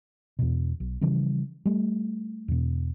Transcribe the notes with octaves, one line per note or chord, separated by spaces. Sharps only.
E2 B2
B1
C#3 E3 F3 G3
G3 A3
E2 B2